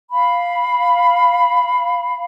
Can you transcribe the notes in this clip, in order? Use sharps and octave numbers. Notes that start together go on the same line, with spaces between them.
F5 B5